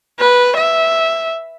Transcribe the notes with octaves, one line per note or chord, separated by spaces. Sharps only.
B4
E5